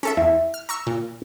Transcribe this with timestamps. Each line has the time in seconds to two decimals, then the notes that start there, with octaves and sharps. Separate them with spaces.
0.03 C#4 A4 E5
0.17 E2 E5
0.54 F6
0.69 A#5 C#6 E6
0.87 A#2